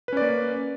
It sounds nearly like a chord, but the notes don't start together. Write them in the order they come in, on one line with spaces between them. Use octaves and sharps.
B4 C#4 D5 A#3